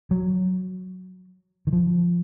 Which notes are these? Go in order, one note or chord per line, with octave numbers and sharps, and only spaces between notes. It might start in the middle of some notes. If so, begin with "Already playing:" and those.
F#3
D#3
F3